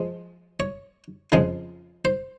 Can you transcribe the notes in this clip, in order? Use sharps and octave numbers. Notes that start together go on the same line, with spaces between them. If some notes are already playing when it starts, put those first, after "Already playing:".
Already playing: F3 G#3
C#5
F2 C#3 F3 G#3
C5